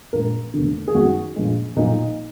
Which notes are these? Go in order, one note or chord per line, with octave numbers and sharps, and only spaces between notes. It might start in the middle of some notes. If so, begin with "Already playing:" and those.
A#1 A#2 G#3 A#4
F1 D#2 D3
G#4
G#1 F#2 D#3 F#4
A#1 A#2 F3 G#3
B1 A#2 F3 D#4